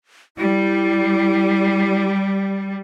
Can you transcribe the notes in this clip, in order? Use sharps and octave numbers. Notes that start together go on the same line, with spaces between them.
G3 E4